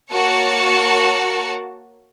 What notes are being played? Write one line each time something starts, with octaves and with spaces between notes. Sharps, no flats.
A#3 F#4 A#4 C#5 A5 C#7